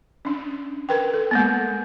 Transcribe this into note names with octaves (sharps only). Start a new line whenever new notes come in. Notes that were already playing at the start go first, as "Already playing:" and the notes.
C#4 D4
A#4 B4 G5
A4
G#3 A#3 B3